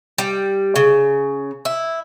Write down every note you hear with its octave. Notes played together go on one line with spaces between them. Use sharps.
G3
C#3
E4